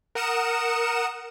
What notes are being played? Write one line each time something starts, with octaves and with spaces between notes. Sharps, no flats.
A#4 F#5 D#6 C#7 E7